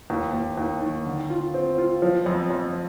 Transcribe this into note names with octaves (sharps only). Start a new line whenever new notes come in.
D#2
D#2
D#2
D#3
D3
F4
C4
F4
F3
F2
F2